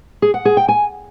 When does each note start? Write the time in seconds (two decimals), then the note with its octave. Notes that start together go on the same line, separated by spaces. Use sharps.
0.22 G#4
0.34 F#5
0.45 G#4
0.57 G5
0.68 G#5